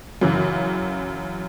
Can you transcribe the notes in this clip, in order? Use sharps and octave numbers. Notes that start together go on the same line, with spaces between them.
F#2 C#3 E3